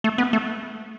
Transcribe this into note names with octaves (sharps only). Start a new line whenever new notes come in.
A3
B3
A3